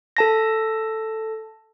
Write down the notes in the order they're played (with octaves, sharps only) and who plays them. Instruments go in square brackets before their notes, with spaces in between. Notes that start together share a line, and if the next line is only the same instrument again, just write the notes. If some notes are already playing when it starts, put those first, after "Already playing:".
[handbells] A4 A5 A#6